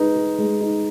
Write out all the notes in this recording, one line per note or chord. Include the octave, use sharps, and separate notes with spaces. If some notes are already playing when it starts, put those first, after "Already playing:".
Already playing: G#3 D#4 B4
G#4
G#3
D#4